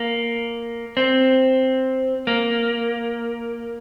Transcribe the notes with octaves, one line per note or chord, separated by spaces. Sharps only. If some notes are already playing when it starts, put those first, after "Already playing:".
Already playing: A#3
C4
A#3